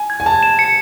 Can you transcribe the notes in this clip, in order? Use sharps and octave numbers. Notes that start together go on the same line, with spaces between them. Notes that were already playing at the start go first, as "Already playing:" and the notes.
Already playing: G#5
G#6
G#5
A5 G#6
E7
C#7